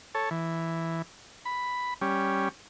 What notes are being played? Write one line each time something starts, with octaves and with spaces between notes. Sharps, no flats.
A4 C#5
E3
B5
G3 C#4